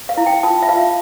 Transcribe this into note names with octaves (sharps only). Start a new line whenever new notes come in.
F5
E4
G5
F4 A5
E5
F4 F5